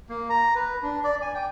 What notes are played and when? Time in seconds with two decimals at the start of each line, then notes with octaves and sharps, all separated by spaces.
0.09 A#3
0.30 A#5
0.55 B4
0.83 D4
1.04 D5
1.22 G#5
1.34 G5